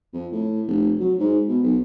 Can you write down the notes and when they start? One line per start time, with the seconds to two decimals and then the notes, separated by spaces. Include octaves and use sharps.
0.13 F2
0.32 A2
0.67 F1
0.99 F#3
1.19 G#2
1.48 B2
1.63 B1